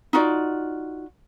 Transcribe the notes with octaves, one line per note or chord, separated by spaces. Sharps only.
D#4 F4 F#4 D5